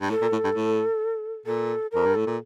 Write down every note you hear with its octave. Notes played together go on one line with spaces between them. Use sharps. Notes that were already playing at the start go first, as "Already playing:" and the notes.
G2
A2 A4
A#2
A2
G2
A2
A#2 A4
F2 A#4
G2
A2 A4
A#2